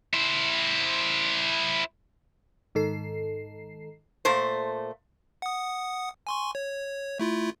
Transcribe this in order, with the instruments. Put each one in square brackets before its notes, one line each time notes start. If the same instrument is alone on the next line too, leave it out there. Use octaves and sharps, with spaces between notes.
[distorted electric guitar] E4 C5
[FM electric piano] G#2 D#3 A4 C7
[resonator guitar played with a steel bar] A#2 A3 C5
[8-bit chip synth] F#5 D#6
G#5 C6 C#6
C#5
A3 E4 F4